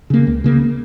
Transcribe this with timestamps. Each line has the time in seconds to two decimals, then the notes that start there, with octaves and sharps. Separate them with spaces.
0.10 C#3 A#3
0.27 C#2
0.44 C#3 A#3